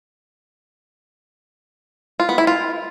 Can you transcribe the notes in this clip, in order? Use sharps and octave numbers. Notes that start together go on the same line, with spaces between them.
F4
B3
E4
F4